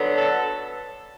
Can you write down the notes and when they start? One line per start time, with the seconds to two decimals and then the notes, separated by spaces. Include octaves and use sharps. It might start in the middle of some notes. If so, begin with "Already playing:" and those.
Already playing: D3 F#3 B3
0.15 A4